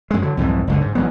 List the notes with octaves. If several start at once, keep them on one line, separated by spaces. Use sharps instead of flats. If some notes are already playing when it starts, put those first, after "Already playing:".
F#2 G#3
D3 F#3
C2 F2 G#2 E3
F#1 C#2 D3
G#2
A1 F#3 B3